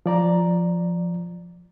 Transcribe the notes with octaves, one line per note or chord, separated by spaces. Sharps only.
F3 D5 A#5